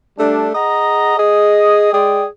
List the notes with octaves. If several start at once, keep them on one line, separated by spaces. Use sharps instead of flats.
G3 A3 D4
G#4 D#5 F#5 A#5
G#4 D#5
G#3 G#4 D5 G5